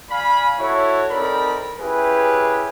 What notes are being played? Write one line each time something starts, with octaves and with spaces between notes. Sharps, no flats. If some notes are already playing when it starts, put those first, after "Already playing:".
D5 F5 G#5 B5
E4 F#4 A4 C#5
C4 D#4 A4 A#4 D5 B5
C#4 E4 G4 G#4 B4